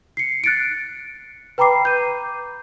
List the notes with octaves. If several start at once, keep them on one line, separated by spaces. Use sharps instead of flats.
C7 C#7
F#6 A6 C#7 D7
B4 G5 A#5 B5 D6 C7
G6 D#7